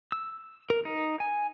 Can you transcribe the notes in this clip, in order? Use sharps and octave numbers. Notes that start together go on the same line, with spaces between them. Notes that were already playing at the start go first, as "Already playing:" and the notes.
E6
A#4
D#4
G#5